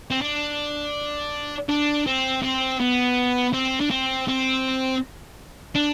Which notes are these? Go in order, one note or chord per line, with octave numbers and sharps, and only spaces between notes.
C4
D4
D4
C4
C4
B3
C4
D4
C4
C4
D4